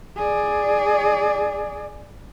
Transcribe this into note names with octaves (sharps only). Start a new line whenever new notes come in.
G#4 D5